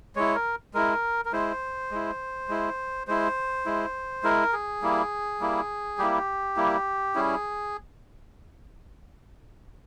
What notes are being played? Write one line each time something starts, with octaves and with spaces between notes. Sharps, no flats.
G#3 E4 C#5
A#4
G#3 E4 A#4
A#4
G#3 E4 C5
G#3 E4
G#3 E4
G#3 E4 C5
G#3 E4
G#3 E4 A#4
G#4
G3 A#3 E4
G3 A#3 E4
G3 A#3 E4 G4
G3 A#3 E4
G3 C#4 E4 G#4